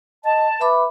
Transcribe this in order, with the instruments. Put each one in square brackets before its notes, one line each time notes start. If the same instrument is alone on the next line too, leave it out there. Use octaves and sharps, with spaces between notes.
[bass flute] D#5 [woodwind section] A5
[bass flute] B4 [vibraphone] E5 B5 D6